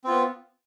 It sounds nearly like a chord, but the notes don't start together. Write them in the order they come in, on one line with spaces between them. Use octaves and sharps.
C4 F4 B3